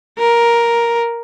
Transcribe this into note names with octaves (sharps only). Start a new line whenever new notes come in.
A#4